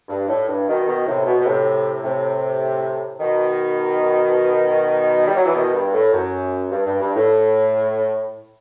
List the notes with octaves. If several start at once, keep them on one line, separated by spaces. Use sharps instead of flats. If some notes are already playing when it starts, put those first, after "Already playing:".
G2
A2
G2
B2 D#3
B2 D#3
A2 C3
B2
B2
A2 C3
A2 C3
B2 D#3
G3
F#3
E3
B2 D#3
G2
A2
F#2
G2
G2
G2
A2